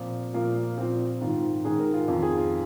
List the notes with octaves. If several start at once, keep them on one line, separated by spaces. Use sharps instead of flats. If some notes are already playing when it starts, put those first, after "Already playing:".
Already playing: A#2 F3 C4
A#2 F3 A#3
A#2 F3 C4
G#2 D#3 F4
G#2 D#3 G#4
A#4
F4
F2 D#3 F4
G#4
F4